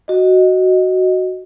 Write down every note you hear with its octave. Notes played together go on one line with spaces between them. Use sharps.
F#4 D#5